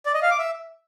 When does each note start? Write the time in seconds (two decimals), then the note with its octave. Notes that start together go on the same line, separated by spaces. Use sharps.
0.06 D5
0.14 D#5
0.22 F5
0.31 D6
0.39 E5